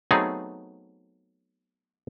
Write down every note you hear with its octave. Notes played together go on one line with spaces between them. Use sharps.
F#3 A3 B3 C4 D#4 G#4